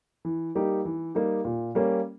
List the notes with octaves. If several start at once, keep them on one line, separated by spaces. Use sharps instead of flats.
E3
G3 A#3 D#4 G4
E3
G3 A#3 D#4 G4
A#2
G3 A#3 C#4